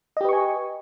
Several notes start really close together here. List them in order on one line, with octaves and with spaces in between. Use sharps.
D#5 G4 B4 C#6 G#5